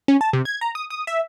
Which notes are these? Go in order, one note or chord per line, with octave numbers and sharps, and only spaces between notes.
C#4
A5
C3
G#6
A#5
D#6
D#6
E5